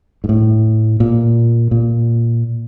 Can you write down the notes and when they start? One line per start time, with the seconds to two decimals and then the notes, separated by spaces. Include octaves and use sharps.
0.24 G#2
0.29 A2
1.00 A#2
1.71 A#2